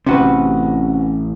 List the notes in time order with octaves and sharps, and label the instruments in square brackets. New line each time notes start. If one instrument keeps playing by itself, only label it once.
[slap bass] A1 C#4 [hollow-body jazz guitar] C3 F#4 B4